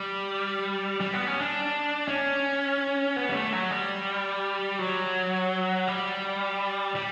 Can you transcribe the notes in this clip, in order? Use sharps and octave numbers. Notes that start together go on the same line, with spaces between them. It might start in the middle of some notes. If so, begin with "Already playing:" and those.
Already playing: G3
G3
B3
C#4
D4
C#4
B3
G3
A3
F#3
G3
F#3
G3
G3